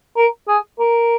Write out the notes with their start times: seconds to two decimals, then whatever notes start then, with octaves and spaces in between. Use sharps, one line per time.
0.17 A#4
0.48 G#4
0.79 A#4